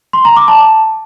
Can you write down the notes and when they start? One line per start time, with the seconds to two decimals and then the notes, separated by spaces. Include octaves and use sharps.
0.13 C6
0.25 A#5
0.36 D6
0.48 A5